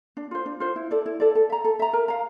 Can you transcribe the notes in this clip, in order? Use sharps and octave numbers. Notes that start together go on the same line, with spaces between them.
D4
F4 C5
D4
F4 C5
E4
A4 D5
E4
A4 D5
A4
E5 A#5
A4
E5 A#5
A#4
F5 A#5